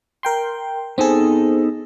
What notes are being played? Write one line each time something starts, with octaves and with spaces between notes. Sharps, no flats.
A#4 G5 C6
B3 C4 D#4 G#4 A4